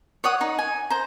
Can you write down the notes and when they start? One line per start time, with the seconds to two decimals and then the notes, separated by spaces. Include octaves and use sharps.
0.24 C#5 D5 F#5 D#6
0.41 D#4
0.59 G#5
0.90 C5 A#5